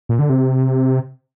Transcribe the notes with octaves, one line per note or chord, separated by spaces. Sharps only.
A#2
D3
C3